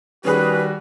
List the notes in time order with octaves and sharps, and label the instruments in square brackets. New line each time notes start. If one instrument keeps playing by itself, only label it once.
[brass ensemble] D#3 G3 F#4 [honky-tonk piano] C#4 G#4 F#6 [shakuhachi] B4